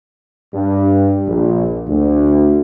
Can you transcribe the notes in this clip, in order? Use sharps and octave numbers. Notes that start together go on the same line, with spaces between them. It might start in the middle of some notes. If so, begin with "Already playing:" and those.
G2
A#1
D2